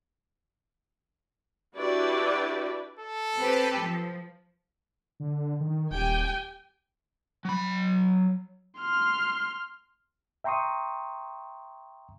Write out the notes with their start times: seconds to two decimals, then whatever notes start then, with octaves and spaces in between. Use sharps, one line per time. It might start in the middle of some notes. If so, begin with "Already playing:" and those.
1.76 D4 E4 F#4 G4 B4 D5
2.99 A4
3.37 C4 G4 B4
3.80 F3
5.20 D3
5.60 D#3
5.91 D#1 G4 G5 G#5
7.45 F#3 B5
8.79 C6 F6
10.44 E5 G5 A#5 C6 C#6 D#6